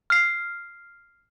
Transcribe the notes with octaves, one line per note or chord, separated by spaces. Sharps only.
F6 C7